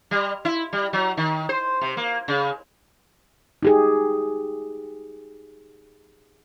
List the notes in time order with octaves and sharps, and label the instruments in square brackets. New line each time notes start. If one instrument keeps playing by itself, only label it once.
[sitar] G3
E4
G3
F#3
D#3
C5
C3
A#3
C#3
[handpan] D#4 G4 G#4